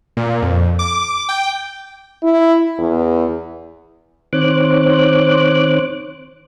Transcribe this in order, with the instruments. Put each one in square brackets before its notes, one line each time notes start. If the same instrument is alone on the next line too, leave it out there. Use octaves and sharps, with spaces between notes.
[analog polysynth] A#2
F2
D6
G5
[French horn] E4
E2
[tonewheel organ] D#3 C4 C5 C#5 D6 F#6